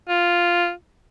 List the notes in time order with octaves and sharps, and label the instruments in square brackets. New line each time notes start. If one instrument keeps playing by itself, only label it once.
[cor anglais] F4